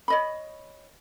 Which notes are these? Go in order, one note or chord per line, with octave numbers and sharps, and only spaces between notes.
C#5 D#5 B5